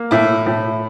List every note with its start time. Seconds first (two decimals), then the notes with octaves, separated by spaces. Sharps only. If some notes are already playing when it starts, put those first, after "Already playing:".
Already playing: A#3
0.11 A2 E4
0.46 A2 E4